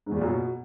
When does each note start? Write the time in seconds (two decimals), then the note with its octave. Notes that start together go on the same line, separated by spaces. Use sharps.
0.06 G#2
0.11 E2
0.17 A#2
0.22 F#2
0.27 B2